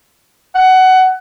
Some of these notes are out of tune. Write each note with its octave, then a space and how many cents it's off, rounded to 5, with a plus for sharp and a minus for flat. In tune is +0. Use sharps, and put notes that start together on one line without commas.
F#5 +20